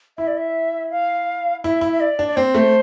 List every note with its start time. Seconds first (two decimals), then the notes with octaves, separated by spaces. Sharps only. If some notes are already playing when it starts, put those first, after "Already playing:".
0.18 E4 E5
0.27 D5
0.37 E5
0.91 F5
1.64 E4 E5
1.81 E4
1.93 E5
2.00 D5
2.19 D4
2.27 D5
2.36 C4 C5
2.55 A3